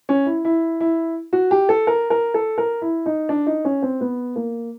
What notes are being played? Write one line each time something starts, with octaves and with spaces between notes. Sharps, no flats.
C#4
E4
E4
E4
F#4
G4
A4
A#4
A#4
A4
A#4
E4
D#4
D4
D#4
C#4
C4
B3
A#3